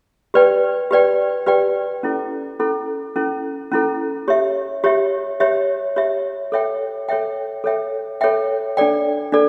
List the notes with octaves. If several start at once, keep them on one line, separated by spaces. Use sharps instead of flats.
G4 B4 D5 G5
G4 B4 D5 G5
G4 B4 D5 G5
C#4 E4 A4
C#4 E4 A4
C#4 E4 A4
C#4 E4 A4
G4 C#5 E5
G4 C#5 E5
G4 C#5 E5
G4 C#5 E5
A4 C#5 E5 G5
A4 C#5 E5 G5
A4 C#5 E5 G5
A4 C#5 E5 G5
D4 A4 D5 G5
D4 A4 D5